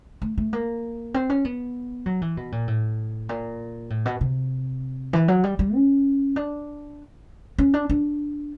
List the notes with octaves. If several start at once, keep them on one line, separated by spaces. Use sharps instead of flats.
A3
A3
A#3
C4
C#4
B3
F#3
E3
B2
A#2
A2
A#2
A2
B2
C3
E3
F#3
G3
G3
C#4
D4
C#4
D4
D4